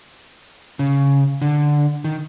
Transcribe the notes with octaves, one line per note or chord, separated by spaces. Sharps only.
C#3
D3
D#3